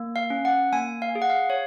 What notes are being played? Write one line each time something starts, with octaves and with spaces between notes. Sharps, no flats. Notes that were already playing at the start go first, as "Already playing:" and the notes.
Already playing: A#3
F5
C#4
F#5
A#3 G#5
F5
G#4
F#5
F5
C#5